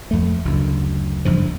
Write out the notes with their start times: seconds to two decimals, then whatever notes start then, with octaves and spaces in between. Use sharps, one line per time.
0.11 F2 A3
0.45 F#1 D2
1.25 F#1 E2 G2 F3